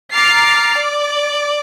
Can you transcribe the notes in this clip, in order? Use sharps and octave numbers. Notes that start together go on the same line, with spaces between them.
A#5 D6 F6 A6 C7
D5